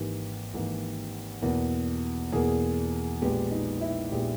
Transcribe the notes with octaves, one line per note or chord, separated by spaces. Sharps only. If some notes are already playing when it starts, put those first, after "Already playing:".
Already playing: G#1 G#2 E3 A#3 G4
G#1 G#2 E3 A#3
E2 B2 A#3
E2 B2 A#3 G#4
A#1 A#2 G#3 B3 G4
D#4
E4
A#1 A#2 G#3 B3 G4